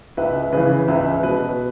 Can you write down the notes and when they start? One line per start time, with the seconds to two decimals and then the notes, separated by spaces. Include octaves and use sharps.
0.17 C#2 B4 E5
0.53 C#3 E3 B4
0.88 C#2 B4 E5
1.23 B2 B4